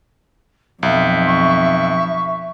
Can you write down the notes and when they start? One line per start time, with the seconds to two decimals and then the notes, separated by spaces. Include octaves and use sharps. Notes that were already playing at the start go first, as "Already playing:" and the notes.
0.83 B1 F2 E5
1.28 C#6